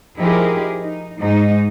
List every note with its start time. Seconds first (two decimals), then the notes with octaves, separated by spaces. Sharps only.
0.16 F3 D#4 E4 G4 G#4 A#4
0.82 D#4
1.19 G#2 D#4